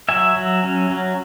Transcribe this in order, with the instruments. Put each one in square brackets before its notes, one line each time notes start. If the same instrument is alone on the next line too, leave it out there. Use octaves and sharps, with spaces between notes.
[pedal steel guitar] F#3 E5 G#5
F#3
C#4
F#3